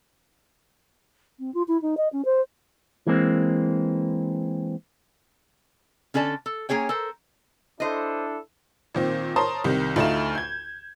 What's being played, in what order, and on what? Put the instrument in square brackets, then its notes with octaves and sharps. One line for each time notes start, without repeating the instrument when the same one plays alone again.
[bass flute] C4
F4
E4
D#4
D#5
C#4
C5
[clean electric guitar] E3 G#3 A#3 C4
[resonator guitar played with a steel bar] D3 C#4 A4 D5 A5
A4
A#3 C#4 G#4 C#5 G5
A4 A#4 C5
[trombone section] D4 E4 A4 [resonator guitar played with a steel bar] C5 D#5
[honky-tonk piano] A#2 D#3 C4
A#4 C5 C#5 A5 C6 D#6
C2 C3 D#3
D2 A3 D#4 F4 F6 E7
G6 G#6